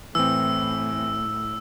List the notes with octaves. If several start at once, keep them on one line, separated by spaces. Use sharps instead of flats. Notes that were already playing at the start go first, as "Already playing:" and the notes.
A2 E3 C4 E6